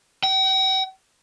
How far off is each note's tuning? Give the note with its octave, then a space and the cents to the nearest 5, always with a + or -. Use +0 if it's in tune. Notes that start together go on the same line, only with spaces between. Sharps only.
G5 -45